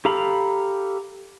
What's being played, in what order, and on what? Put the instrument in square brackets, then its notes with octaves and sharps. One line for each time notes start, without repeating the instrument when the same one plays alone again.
[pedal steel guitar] G4 A4 F5 A#5 B5